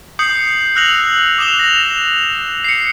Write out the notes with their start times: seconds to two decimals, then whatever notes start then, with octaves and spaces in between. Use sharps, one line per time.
0.19 D#6 G6 C7 C#7 F#7
0.76 E6 F#6 A#6 F7 F#7
1.38 D6 D#6 E7 F7 G7
1.59 A#6 F7
2.64 C7 C#7